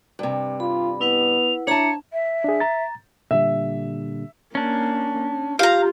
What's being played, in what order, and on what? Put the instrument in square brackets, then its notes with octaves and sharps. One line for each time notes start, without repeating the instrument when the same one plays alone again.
[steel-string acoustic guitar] G2 C3
[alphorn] F4 [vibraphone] B5
[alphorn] B3 [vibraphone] E4 B4 F#5 [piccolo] F7
[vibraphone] D4 A#5 [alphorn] E4 [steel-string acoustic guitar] C#5 A5 [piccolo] C#7
[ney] E5
[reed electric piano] D4 G#4
A#5 A6
[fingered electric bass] A#2 D3 G3 [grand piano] E5
[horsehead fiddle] A#3 [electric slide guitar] C#4 D4
[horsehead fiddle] F4 [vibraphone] G4 [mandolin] F5 A#5